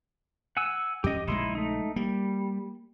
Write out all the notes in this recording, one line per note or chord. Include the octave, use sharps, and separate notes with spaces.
F#5 G#5 E6
F2 C#4 G4 D#5
A#1 C#3 G#3 D#4 E4 C6
A3 D#4
G3 A#3